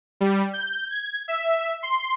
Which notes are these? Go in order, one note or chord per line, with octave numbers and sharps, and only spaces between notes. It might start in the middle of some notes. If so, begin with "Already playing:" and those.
G3
G6
G#6
E5
C6